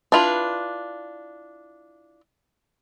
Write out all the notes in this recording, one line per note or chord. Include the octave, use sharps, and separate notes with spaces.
D4 E4 F4 B4